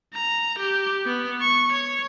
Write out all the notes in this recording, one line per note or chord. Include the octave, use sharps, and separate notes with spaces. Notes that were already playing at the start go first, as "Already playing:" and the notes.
A#5
G4
B3
C#6
C#5